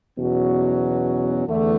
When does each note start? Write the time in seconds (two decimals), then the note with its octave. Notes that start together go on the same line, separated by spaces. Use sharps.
0.17 E2 B2 F#3 C#4 F#4
1.47 E2 D3 A3